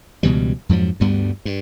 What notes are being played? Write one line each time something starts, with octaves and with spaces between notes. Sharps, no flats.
C#2 B2 E3 G3
F2 G#2 F3 F#3
D2 G2 G3 B3
G2